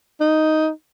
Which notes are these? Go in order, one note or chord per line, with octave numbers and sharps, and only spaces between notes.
D#4